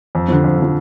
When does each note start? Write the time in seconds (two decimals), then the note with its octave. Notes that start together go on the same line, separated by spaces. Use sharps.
0.15 F2
0.28 D3 F3
0.44 F2
0.58 D3 F3